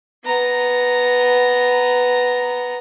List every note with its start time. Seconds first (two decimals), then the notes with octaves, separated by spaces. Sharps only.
0.24 B3 A#5